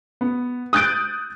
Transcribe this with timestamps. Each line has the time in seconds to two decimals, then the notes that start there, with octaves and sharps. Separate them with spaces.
0.21 B3
0.73 D#6 F#6 G6 A6 D7